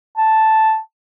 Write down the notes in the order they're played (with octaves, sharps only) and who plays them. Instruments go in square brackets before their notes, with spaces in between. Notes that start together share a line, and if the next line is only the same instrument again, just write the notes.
[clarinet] A5